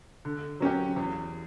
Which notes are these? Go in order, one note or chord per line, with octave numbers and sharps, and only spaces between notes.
D3
F#3 C#4 G4
E2